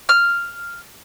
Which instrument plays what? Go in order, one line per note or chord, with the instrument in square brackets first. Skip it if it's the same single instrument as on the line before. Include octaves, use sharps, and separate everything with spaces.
[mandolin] F6